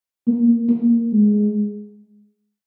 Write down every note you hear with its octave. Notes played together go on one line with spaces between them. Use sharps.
A#3
A#3
G#3